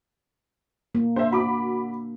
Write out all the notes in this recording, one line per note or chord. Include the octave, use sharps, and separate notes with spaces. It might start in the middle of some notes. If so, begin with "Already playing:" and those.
A#3
D4 C5 E5
F#4 B5 D6